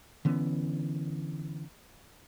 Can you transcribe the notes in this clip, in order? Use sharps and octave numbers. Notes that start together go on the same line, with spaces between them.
D3 E3 B3 C#4